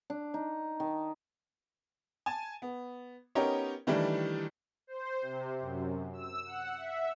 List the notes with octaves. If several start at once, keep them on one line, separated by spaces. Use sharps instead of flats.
D4
D#4
D#3
G#5 A5
B3
B3 C#4 D#4 G4 A#4 C#5
D#3 E3 G3 A3 D4
C5
C3
F#2
E6
F#5
E5